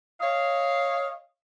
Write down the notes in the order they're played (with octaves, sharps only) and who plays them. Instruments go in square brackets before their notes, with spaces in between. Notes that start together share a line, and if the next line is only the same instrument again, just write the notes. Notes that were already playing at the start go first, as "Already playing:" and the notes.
[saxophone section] C#5 D#5 F5